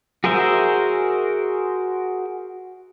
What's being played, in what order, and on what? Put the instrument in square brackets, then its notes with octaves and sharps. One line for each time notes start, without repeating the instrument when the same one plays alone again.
[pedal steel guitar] F#4 G#4 A#4 C5 E5